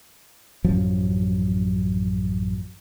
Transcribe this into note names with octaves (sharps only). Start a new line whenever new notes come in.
A1 F#2 F3 F#3